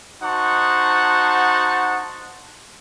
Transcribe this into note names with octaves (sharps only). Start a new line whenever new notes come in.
D#4 F#4 C5 F#5 A5 C#6